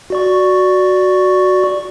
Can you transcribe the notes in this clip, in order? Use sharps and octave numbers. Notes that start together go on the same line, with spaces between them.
F#4 D5 C#6